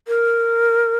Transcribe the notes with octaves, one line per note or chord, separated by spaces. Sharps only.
A#4